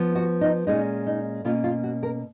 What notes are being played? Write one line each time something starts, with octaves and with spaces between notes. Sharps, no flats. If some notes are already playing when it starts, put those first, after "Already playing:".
Already playing: F3 B3
F#4
D#4
A#2 G#3 C#4 D#4
D#4
B2 A#3 C#4 F4
F4
F#4
A#4